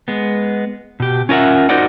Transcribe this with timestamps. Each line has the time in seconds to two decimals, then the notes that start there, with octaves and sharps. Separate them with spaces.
0.08 G#3 B3
1.00 B2 G4
1.29 C#4 F4 A#4 E5 F#5
1.69 D#4 F#4 A#4 C5 D5 F#5